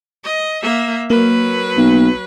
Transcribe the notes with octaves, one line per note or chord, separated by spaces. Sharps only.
D#5
A#3 E5
F#3 A#3 B4
B1